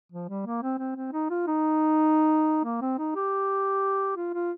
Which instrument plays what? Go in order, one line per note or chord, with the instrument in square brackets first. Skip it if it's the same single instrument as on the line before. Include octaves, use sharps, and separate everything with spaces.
[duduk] F3
G3
A#3
C4
C4
C4
D#4
F4
D#4
A#3
C4
D#4
G4
F4
F4